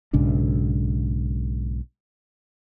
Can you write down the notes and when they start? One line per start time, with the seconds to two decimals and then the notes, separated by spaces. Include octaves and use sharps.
0.13 B1 G#2 C#3 D4